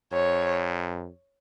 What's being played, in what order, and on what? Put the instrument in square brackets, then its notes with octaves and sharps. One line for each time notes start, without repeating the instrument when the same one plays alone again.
[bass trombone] F2 [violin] C#5